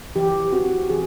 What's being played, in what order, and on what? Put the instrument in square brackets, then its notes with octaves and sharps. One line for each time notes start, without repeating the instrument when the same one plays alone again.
[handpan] E3 G4
C4 F#4
E3 G#4